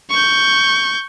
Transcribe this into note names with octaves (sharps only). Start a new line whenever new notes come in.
C#6 G6